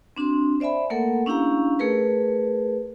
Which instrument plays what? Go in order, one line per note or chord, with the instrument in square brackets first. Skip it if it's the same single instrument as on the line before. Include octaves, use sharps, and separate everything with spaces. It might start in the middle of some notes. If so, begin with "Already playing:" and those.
[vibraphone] C4 D4 F#4 C6
C5 D5 E5 G#5 B5
A3 A#3 A4 A#4 F#5
C#4 D4 E4 G4 F5 A#5
A3 G#4 A#4 B4